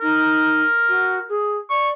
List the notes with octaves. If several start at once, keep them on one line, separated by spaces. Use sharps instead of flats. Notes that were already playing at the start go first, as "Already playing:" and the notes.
D#4 A#4
F#4
G#4
D5 C#6